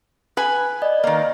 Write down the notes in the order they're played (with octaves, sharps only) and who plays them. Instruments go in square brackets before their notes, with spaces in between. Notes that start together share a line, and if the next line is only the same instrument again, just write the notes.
[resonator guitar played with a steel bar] B4 G#5
[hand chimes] D5 D#5
[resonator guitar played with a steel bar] D#3 A#3